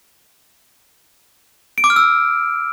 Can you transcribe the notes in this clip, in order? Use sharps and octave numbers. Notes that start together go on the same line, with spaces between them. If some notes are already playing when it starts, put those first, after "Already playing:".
D7
D6
F6
E6